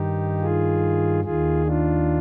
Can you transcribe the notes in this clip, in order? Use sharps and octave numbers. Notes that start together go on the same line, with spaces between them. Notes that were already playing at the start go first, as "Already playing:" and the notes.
Already playing: G2 D#3 D#4 G4
F4 G#4
D#2 D#3 F4 G#4
D4 F4